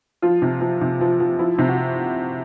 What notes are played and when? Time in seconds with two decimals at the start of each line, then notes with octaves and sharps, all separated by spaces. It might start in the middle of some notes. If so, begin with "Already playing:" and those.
0.22 F3 F4
0.42 C3
0.61 F3
0.81 C3
1.01 F3
1.20 F3
1.39 F3 E4
1.59 C3
1.69 F#4